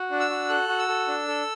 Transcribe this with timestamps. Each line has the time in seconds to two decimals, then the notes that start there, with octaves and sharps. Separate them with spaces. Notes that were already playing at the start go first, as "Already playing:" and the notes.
Already playing: F#4
0.10 D4
0.20 E6
0.30 F#4
0.49 A4 F#6
0.68 F#4
0.79 E6
0.88 A4
1.08 D4
1.28 A4